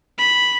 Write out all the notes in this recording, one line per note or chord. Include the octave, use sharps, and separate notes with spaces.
B5